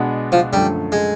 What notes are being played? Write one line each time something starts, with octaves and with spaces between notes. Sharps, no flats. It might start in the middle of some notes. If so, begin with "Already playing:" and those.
Already playing: B2 G#3 B3 D4
F3
F#2 D3 F3 G3 A3
G#3